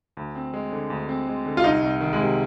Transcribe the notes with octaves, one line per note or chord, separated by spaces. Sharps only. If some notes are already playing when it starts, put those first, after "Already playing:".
D2
C4
G#3
D3
D2
C4
G#3
D3
F4
C2 D#4
C2
D#3
G#3
C3